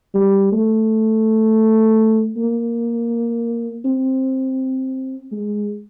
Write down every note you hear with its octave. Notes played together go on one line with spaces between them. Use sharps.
G3
A3
A#3
C4
G#3